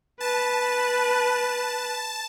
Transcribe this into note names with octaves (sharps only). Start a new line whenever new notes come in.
B4 A5